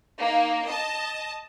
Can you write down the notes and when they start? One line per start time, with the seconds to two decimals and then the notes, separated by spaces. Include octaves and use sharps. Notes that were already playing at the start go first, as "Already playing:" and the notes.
0.20 A#3 D#4
0.67 D#5 A5